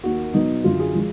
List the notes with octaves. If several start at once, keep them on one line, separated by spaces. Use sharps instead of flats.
D#2 D#3 A#3 F#4
B2 F#3 B3 D#4
F#2 D3 F#3 F4
G#4
F3 G#3